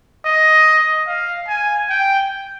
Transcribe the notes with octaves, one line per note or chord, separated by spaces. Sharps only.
D#5
F5
G#5
G5